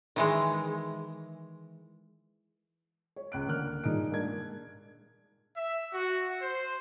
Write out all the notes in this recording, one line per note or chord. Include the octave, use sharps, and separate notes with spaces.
D#3 E3 G#3
C#5
C#2 F#6 D7
D3 A#3 F6 F#6
G2 A#2 D#4 G#4 D7
G#3 A#3 D4 G#6
E5
F#4
C5